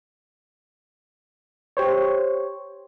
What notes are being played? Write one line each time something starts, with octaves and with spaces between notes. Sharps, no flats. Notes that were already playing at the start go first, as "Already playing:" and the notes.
G4 C5 C#5